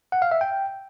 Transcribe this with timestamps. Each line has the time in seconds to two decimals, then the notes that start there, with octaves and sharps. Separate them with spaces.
0.12 F#5
0.22 F5
0.31 E5
0.41 G5